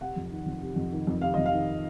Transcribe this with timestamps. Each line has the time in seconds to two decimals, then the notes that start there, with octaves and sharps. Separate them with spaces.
0.01 C3 F#5
0.16 F2
0.31 D#3
0.46 F2
0.61 C3
0.76 F2
0.92 D#3
1.07 F2
1.21 C3 F5
1.34 F2 D#5
1.46 F5
1.53 D#3